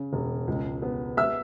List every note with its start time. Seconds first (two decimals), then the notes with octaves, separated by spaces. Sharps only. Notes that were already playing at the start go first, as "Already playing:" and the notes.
Already playing: C#3
0.13 E1
0.47 C#2
0.82 B3
1.17 E5 E6